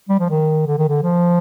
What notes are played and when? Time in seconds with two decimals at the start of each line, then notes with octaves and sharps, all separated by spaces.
0.09 G3
0.20 F3
0.30 D#3
0.66 D3
0.78 D#3
0.89 D3
1.03 F3